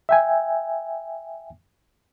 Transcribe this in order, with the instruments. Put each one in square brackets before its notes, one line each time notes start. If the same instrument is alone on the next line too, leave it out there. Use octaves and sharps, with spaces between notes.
[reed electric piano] E5 G5 G#5